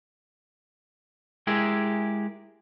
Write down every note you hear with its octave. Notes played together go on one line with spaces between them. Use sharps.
G#3 E4 G4 G#4 A#4